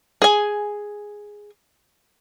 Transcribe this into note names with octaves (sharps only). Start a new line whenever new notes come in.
G#4 G#5